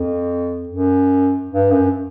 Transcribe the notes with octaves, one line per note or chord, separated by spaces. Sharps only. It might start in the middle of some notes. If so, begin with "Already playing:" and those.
Already playing: F2
F#2
G2
F#2